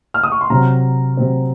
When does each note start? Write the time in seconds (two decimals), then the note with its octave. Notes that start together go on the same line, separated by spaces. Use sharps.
0.14 F6
0.23 D#6
0.32 C#6
0.41 C6
0.50 C3 F#3 C4 A#5
1.17 C3 F#3 C4